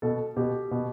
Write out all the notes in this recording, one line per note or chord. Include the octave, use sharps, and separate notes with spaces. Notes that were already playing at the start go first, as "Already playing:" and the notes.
B2 A4
B2 G4
B2